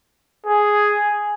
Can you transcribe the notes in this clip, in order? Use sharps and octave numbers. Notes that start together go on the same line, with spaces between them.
G#4